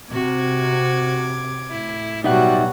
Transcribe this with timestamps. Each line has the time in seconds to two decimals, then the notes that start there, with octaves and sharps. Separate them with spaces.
0.12 C3 F#4 D6 G#6
1.71 A2 E4
2.24 B2 F#3 G3 D#4 F#4 E5 F#5